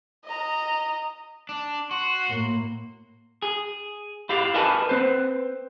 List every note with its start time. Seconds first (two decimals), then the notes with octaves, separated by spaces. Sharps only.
0.25 D#5 A#5
1.49 D4
1.91 F#4 C6
2.27 A2 A#3
3.42 G#4
4.29 E4 G4 F5
4.54 A#4 B4 D#5 G#5 A5 B5
4.89 C4 B4 C5